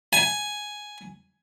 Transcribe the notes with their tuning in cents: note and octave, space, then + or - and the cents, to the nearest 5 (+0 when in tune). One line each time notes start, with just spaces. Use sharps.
G#5 +5